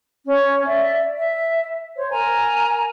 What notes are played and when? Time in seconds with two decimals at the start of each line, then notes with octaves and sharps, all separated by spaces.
0.24 C#4
0.66 D5 E5
1.17 E5
1.95 C5 C#5
2.11 A#4 G#5 A#5